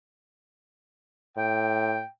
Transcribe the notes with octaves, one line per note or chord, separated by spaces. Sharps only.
A2 G5